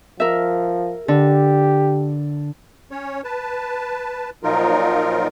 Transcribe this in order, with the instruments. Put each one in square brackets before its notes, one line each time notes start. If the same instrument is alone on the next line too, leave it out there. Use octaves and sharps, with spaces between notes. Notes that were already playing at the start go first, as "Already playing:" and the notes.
[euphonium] F3 [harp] A#4 E5
[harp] D3 [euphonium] G4
[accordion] C#4 C#5
B4 A5
A#2 F3 F#3 D#4 F4 A#4